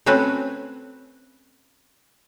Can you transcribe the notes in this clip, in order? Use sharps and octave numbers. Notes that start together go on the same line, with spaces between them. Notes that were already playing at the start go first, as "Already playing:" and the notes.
A3 C4 C#4 F#4 B4